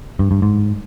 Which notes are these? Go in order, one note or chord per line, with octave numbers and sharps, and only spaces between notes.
G2
G2
G#2